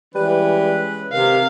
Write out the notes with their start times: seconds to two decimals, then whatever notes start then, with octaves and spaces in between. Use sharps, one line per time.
0.15 E3 G3 G#3 C#4 B4
1.12 C3 D#3 F5